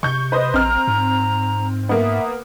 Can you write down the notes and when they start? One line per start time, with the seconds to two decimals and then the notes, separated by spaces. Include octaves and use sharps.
0.03 C3 C#6 G6
0.32 B4 C5 D#5
0.54 A#1 C4 A#5 F6
0.88 G#2
1.89 A#3 B3 E5